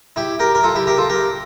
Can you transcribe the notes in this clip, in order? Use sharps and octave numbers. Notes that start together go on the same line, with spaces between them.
E4 G4
G4 A#4
A#4
F4 A4
E4 G4
G4 A#4
F4 A4
G4 A#4